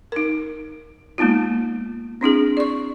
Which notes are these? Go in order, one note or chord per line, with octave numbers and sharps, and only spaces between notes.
D#4 A#4
G#3 A#3 B3 D#4 F4
C4 D4 E4 G#4
D5 C#6